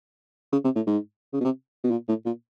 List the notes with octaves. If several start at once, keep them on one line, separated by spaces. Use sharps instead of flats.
C#3
C3
A2
G#2
C#3
B2
C3
B2
A#2
A2
A#2